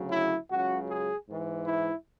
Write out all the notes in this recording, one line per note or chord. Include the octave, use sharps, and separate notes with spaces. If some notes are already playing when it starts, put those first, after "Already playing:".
Already playing: D2 C#3 F#3
E4
C#2 C#3 F#3 F#4
G#4
G#2 E3
E4